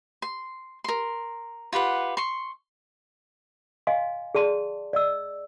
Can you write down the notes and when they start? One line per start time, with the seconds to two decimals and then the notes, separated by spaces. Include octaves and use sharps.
0.22 C6
0.84 A#4 C6
1.72 F4 G4 B4 F#5
2.17 C6 C#6
3.87 D#5 F5 G#5 C6
4.35 G#4 D5 A5 C6
4.93 D5 D#5 E6